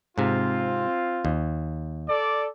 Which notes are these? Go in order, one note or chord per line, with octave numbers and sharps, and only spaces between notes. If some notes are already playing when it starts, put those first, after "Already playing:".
G#2 C3 C4 F4
D#2
A4 D5